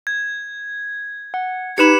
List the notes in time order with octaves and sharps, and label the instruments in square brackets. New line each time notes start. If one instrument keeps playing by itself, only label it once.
[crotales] G#6
[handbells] F#5
[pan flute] D#4 [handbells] G4 B4 B5 [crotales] C#7 E7